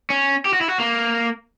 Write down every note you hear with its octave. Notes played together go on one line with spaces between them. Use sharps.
C#4
G4
F#4
E4
F#4
A#3